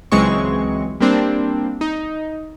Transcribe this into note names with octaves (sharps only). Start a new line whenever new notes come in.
C#2 E3 F#3 G#3 C4 C#6
G3 A#3 C4 D4
D#4